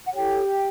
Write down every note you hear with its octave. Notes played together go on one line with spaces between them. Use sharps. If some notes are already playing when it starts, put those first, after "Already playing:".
F#5
E4 G4 A4 C#5 G5